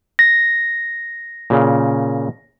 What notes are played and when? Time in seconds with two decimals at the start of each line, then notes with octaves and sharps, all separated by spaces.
0.19 A#6
1.50 A#2 C#3